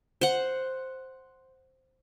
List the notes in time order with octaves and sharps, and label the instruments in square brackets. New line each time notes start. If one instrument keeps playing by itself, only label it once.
[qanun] C5 F#5